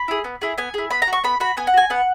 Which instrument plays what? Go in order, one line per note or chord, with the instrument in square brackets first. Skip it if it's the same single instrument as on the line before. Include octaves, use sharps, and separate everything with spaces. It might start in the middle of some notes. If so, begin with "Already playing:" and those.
Already playing: [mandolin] B5
E4 G#4
B3
E4 G#4
B3 G#5
E4 G#4
B3 B5
A#5
F#4
C#6
B3 B5
F#4 B5
B3 G#5
F#5
F#4 G#5
B3 F#5